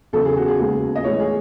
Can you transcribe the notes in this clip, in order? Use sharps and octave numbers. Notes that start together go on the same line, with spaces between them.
E2 C#3 F#3 B3 A4
G#4
F#4
G#4
D#2 C#3 G#3 B3
D#5
A2 E3 G#3 B3 C#5
G#4